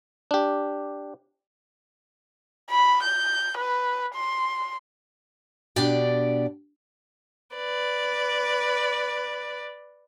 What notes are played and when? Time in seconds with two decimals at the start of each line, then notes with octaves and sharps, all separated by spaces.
0.31 D4 G4
2.70 B5
3.03 G6
3.58 B4
4.15 C6
5.76 B2 D4 G4 D5 G5
7.56 B4 D5